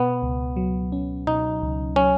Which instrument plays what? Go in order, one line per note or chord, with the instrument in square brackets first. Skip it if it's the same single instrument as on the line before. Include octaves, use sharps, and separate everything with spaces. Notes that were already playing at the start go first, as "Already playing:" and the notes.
Already playing: [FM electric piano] B2 [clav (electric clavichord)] B3
[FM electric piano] C#2
F#3
C#4
[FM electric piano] B2 [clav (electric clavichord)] D#4
[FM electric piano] C#2
[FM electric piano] F#3 [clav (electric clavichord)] C#4